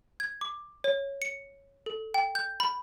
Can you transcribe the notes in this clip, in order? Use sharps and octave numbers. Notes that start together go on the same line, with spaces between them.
G#6
D6
C#5
C#7
A4
G5
G6
B5